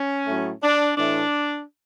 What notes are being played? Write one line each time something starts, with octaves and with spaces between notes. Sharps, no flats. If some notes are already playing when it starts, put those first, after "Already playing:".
Already playing: C#4
A2 F#3 A3
D4
A2 E3 A3 D4